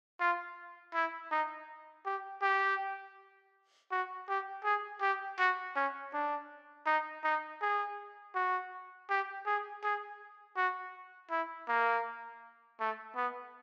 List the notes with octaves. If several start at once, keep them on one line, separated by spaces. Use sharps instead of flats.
F4
E4
D#4
G4
G4
F#4
G4
G#4
G4
F#4
C#4
D4
D#4
D#4
G#4
F#4
G4
G#4
G#4
F#4
E4
A#3
A3
B3